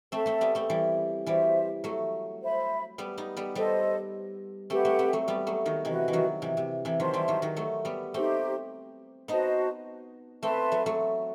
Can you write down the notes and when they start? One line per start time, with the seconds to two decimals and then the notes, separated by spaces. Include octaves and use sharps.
0.12 A3 C4 A4 E5 A5
0.26 A3 C4
0.41 G3 B3
0.55 A3 C4
0.70 E3 G3
1.26 E3 G3 F#4 C5 E5
1.84 F#3 A3
2.41 C5 E5 B5
2.98 G3 B3
3.18 B3 D#4
3.37 G3 B3
3.55 G3 B3 A4 C5 D#5
4.70 A3 C4 G4 B4 F#5
4.85 A3 C4
4.99 A3 C4
5.13 F#3 A3
5.28 G3 B3
5.47 F#3 A3
5.66 D#3 F#3
5.85 C3 E3 F#4 B4 D#5
6.08 E3
6.13 D#3 F#3
6.42 C3 E3
6.57 C3
6.85 C3 E3
7.00 D#3 F#3 C5 E5 A5 C6
7.14 E3 G3
7.28 D#3 F#3
7.42 D#3 F#3
7.57 F#3 A3
7.85 G3 B3
8.14 A3 C4 D#4 G4 C5
9.28 B3 D#4 F#4 C5 D#5 A5
10.43 A3 C4 B4 E5 A5 C6
10.72 F#3 A3
10.86 F#3 A3